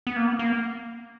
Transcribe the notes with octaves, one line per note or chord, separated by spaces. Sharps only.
B3
A#3
B3
A#3